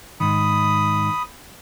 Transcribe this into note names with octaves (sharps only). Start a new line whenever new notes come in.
G#2 D#3 B5 D#6